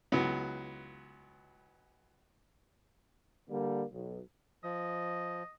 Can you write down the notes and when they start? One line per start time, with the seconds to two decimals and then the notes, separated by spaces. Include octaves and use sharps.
0.12 C#2 E3 F#3 B3
3.51 D3 G3 A#3
3.92 B1
4.64 F3 D#5